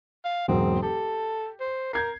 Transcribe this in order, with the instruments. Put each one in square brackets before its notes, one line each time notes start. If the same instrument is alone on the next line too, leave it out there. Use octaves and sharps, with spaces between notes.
[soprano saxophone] F5
[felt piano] E1 G#2 F#3 [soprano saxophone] C4
[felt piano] G4 [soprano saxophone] A4
[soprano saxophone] C5
[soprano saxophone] A#4 [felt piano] G6 G#6 C7